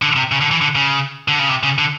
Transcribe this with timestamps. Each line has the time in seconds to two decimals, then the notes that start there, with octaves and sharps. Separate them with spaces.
0.02 D3
0.16 C3
0.32 C#3
0.41 D3
0.51 E3
0.61 D3
0.75 C#3
1.28 D3
1.39 C#3
1.49 C3
1.63 C#3
1.78 D3